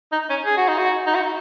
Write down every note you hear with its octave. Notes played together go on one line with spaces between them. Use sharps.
D#4
C#4
G#4
F#4
D#4
F#4
D#4
F#4